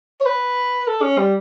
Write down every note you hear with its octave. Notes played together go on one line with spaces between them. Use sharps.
C#5
B4
A4
C#4
G3